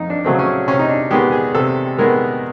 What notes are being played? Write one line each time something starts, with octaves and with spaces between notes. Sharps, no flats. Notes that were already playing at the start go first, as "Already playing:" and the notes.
Already playing: F2 D#4
D4
C#3 F#3 A3 C4
C#4
C3 C#4
D#4
D4
D#3 G#3 B3 G4
G#4
C3 A4
D#3 G#3 B3 A#4